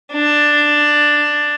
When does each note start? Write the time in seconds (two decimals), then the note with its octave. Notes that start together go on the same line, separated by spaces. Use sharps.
0.13 D4